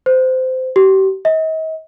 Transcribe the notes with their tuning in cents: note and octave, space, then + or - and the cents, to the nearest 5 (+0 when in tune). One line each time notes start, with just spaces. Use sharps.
C5 -20
G4 -35
D#5 +40